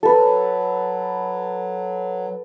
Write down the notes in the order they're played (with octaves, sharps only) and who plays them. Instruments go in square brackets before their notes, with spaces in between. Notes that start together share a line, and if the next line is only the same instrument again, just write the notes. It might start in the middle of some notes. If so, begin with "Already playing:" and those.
[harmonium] F#3 [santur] A4 B4